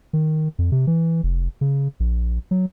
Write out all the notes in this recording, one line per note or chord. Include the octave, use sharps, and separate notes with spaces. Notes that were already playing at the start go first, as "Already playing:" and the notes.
D#3
F2
C3
E3
F1
C#3
A#1
F#3